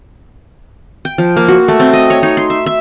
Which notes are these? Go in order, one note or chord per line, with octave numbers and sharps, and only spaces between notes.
G5
F3
A#3
F#4
A3
C4
D#5
C#5
D#4
C6
E5
E5